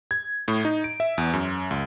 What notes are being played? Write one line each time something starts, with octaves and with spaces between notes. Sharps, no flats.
G#6
A2
D#4
D7
E5
E2
F#2
C#2